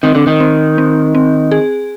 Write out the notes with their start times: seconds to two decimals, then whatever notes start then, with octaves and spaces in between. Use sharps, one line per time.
0.03 D#3 C4
0.15 D3
0.27 D#3
0.40 C4
0.78 C4
1.15 C4
1.51 G#4